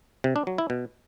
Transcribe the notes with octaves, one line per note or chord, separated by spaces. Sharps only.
C3
D4
F#3
E4
B2